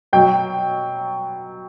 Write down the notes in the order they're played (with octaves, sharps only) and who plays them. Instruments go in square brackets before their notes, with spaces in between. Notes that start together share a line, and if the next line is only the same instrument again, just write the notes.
[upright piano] B2 F#3 G5